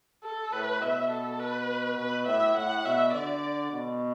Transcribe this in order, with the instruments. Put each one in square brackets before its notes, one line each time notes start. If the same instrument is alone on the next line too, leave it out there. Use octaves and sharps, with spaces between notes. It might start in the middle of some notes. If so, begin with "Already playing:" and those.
[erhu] A4
[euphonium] A2 [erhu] B4
[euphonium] B2 [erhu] E5
[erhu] A4
B4
[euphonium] B2 [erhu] B4
[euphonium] A2 [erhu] E5
[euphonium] A2 [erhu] F#5
[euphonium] B2 [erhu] E5
[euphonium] D3 [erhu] D5
[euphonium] B2